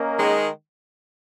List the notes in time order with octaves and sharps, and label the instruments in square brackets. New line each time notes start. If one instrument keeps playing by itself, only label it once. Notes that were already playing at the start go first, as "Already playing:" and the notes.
Already playing: [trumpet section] A#3 C#4 A#4 D#5
[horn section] D#3 G#3